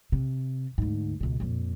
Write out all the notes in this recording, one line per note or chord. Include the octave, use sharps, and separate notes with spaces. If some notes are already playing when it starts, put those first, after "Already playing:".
C3
D2 G#2
C#2 B2
F2 A#2